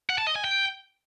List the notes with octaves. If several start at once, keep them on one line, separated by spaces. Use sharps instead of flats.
F#5
A5
D#5
G#5
G5